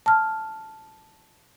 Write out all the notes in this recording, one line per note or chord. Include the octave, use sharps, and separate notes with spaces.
A5 F6